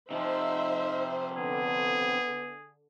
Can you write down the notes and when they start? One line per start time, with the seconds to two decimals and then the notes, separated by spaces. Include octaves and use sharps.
0.11 C3 E3 F3 D#4 C5 E5
1.37 D3 B3 G#4